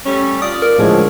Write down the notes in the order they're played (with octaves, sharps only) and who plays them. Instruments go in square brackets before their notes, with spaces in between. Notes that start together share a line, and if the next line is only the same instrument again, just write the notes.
[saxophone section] G3 A3 C#4
[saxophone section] F4 D5 [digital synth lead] D#6
[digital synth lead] A#4
[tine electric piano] A2 F3 G#3 [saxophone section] D3 C#4 G#4